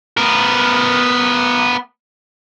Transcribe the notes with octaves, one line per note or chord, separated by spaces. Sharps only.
B3 A#4